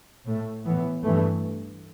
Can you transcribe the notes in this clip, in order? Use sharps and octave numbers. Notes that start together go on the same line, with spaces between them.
A2 A3
A2 E3 B3
G2 E3 A3